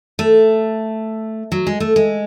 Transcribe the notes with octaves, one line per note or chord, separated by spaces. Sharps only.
A3
F#3
G#3
A3
G#3